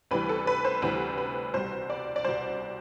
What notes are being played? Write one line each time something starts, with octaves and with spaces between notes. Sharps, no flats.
D2 C3 E3 G3 B4
A4
B4
C5
D2 C3 E3 G3 B4
B4
C2 B2 G3 C5
D5
D5
C2 B2 G3 C5